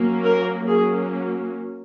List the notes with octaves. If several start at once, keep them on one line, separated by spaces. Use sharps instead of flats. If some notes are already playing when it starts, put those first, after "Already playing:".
Already playing: F#3 A#3 C#4
A#4
F#3 A#3 C#4 G#4